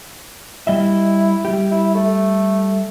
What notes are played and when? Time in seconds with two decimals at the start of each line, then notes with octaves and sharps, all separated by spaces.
0.67 G3 E4 D#5 E5
1.45 G3 G4
1.71 E4
1.95 A3